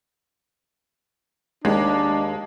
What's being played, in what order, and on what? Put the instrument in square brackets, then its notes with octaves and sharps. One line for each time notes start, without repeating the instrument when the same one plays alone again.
[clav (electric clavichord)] D#2 [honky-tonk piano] G#3 [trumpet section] D4